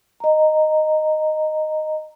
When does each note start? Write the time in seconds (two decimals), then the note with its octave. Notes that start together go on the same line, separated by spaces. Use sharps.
0.20 D#5 A#5